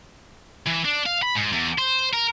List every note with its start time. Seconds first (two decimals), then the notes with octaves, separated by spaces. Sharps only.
0.66 E3
0.85 D4
1.06 F5
1.22 B5
1.35 G#2
1.53 E2
1.78 C5
2.13 A#4